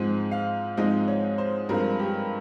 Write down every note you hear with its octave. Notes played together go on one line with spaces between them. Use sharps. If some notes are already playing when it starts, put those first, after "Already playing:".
Already playing: G#2 F3 G#3 C4 D#4
F5
G#2 F3 G#3 C4 D#4 D#5
C#5
C5
G2 F3 G#3 C4 F4 A#4
G4